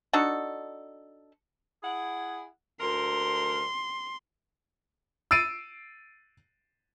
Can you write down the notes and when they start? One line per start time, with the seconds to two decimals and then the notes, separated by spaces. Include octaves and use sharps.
0.13 D4 D#4 F#4 A4
1.83 E4 G#4 F#5
2.81 D2 A#4 C6
5.31 E6 A6 C7 D7 D#7